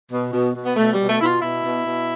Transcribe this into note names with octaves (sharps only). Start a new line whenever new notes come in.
B2
B2
B2
B3
B2 A3
G3
B2
A3
B2 E4
F4
B2 E4
B2
B2